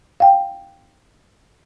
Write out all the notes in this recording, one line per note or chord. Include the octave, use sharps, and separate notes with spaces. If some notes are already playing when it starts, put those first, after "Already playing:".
F5 G5